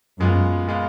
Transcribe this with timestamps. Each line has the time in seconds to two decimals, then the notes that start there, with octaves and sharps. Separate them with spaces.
0.19 F#2 A#2 G#3 B3 F4
0.67 A#2 G#3 B3 F4